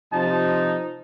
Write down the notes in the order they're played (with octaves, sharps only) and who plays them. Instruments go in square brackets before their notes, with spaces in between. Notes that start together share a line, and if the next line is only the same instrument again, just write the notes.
[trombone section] C3 F3 [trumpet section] D#4 [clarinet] A5